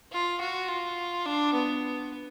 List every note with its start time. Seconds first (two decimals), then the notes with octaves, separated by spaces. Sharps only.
0.12 F4
0.41 F#4
0.69 F4
1.26 D4
1.54 B3